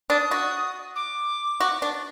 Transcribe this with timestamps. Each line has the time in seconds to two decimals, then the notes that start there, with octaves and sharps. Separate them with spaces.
0.10 D4 D#6
0.31 F#4
0.96 D6
1.60 F#4
1.82 D4